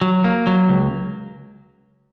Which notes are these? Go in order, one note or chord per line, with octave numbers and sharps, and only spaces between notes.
F#3
A#3
F#3
C#2